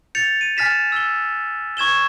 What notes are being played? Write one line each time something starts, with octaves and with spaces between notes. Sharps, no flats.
G6 A6 C#7 F7
D#7
G#5 F6 A6 B6 E7
E6 G7
C#6 G#6 E7 G7